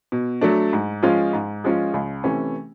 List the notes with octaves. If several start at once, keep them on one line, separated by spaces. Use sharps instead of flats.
B2
F#3 A3 D4
G#2
F3 G#3 C#4 F4
G#2
F3 G#3 C#4 F4
C#2
C3 E3 A3 C#4